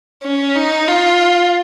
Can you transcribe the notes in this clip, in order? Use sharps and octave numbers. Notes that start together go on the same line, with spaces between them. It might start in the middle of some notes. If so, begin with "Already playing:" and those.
C#4
D#4
F4